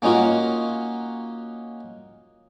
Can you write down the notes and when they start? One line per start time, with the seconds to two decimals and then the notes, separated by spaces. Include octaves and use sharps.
0.02 A#3 C#4 D#4 F4 F#4